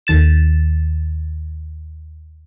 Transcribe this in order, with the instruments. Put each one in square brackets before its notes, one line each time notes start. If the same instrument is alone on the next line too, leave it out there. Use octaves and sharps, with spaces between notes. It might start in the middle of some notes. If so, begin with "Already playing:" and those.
[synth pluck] D#2 D#3 A6 E7